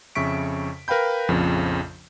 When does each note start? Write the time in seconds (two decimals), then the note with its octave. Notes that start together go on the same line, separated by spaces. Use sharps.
0.15 F2 C#3 E5 C#6 B6 D7
0.88 A#4 B4 F5 G5 B5 G6
1.29 A#1 F2 C#3 F3